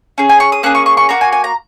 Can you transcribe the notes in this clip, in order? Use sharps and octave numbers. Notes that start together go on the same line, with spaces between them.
C#4 G#4
G#5
C#6
D#6
A#3 C#4 G#4 F#6
C#6
C#6
C#6
A#3 F#4 A#5
G#5
G#5
A#5